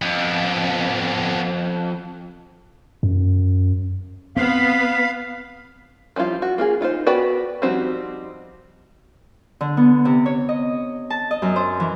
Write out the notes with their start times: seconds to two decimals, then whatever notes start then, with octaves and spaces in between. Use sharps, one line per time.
0.02 F2 B3 D4
3.03 F#2
4.37 B3 C4 F5 B6
6.16 F3 G3 E4 F4
6.42 F#4
6.58 A#3 F4 G#4
6.81 D#4 F4 F#4 C5
7.06 B3 F#4 B4 D5 G5
7.62 F3 G3 C4 D#4 F#4
9.61 D3
9.77 B3
10.05 C3
10.26 C#5
10.49 D#5
11.10 A5
11.31 D#5
11.42 F#2
11.56 C5
11.80 E3